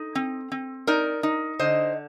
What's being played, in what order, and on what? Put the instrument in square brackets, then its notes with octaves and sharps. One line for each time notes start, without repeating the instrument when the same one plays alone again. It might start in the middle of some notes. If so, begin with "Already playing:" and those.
Already playing: [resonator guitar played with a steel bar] D#4 A4
C4
C4
D#4 A#4 D5
D#4
D3 C5 D#5